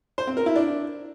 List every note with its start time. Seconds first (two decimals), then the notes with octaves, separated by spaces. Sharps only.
0.18 C5
0.27 C4
0.37 A#4
0.46 E4
0.56 D4